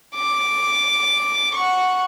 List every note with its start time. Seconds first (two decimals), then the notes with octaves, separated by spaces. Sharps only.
0.15 D6
1.55 F#5 C#6